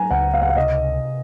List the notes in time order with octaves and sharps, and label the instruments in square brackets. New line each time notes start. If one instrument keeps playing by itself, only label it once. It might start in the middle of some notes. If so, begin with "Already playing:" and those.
Already playing: [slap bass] F#3 [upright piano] G#5 A#5
[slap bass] C#2 [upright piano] F#5
[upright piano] F5
F#5
F5
[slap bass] C3 [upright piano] D#5